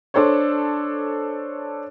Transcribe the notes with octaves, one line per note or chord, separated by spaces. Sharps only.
D4 A4 C5 C#5